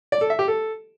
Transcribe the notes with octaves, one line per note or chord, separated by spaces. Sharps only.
D5
A4
E5
G4
A4